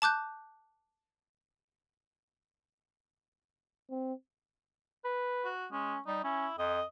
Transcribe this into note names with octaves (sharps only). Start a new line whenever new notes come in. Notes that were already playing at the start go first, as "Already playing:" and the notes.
A5 D6 F#6 G6
C4
B4
F#4
G#3 C#4
G3 D#4
C#4 E4
F2 D#5